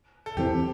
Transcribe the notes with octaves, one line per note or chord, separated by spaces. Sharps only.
A4
E2 E3 A3 C4 G4